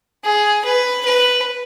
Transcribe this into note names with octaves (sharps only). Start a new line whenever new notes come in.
G#4
B4
B4